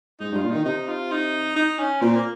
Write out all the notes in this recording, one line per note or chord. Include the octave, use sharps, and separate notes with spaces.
G#2 D#4
G2
F4
A#2
D#3 D#4
C3 D#4
F4
D#4
D#4
C#4
A#2 C4
A#3